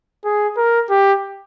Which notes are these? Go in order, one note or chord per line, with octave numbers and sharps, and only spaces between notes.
G#4
A#4
G4